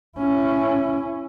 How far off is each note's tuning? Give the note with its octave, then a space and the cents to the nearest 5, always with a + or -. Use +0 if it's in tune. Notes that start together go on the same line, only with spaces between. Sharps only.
C#4 +0 E4 +25